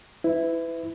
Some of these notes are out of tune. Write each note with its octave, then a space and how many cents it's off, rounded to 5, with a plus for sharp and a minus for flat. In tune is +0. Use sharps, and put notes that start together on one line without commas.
E4 +0 B4 +30